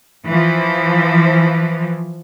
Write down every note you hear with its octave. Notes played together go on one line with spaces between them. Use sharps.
E3 F3